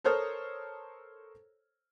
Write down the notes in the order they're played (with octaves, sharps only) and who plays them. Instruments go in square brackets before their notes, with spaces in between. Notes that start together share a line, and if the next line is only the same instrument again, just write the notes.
[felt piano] A4 A#4 C5 C#5 D#6 F6